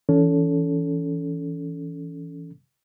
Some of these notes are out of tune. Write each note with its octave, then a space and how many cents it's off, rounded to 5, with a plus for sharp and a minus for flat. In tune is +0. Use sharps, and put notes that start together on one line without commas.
E3 +0 C#4 +30 A4 +0